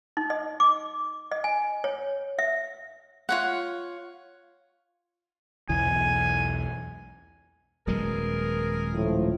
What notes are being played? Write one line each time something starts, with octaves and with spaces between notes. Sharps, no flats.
D#4
D#5
D6
D#5
G#5
C#5
E5
F4 C#5 F#5
B1 E2 E3 G#5
D#1 F#3 G#3 B3 G#4 A#4
A2 F3